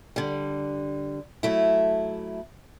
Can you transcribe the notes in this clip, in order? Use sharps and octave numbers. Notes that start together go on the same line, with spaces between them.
D3 G3
F#3 A3 E4